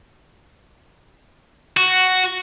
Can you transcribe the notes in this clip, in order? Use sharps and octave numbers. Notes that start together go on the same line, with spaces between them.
F#4